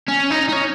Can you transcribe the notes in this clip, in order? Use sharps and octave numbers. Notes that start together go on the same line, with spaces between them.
C#4
D#4
D#4
C#4